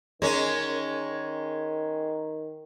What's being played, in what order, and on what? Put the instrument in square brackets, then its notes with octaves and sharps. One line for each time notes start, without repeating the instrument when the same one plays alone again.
[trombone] D#3 [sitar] G#3 C#4 [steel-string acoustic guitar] A#4